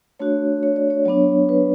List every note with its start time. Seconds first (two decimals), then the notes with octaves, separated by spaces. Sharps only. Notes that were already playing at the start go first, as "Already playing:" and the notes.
0.20 A3 D4 F#4 C#5
0.63 C#5
0.76 D5
0.90 C#5
1.05 F#3 B3 D4 C#5
1.49 B4